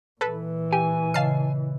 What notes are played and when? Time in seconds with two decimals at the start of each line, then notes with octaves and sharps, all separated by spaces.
0.21 A#2 E3 A4 B4
0.73 G4 G#5
1.14 C#3 D#5 F5 A5 C7